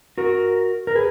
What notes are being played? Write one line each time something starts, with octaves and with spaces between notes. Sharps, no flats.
F#4 A#4
A#4
G#4 B4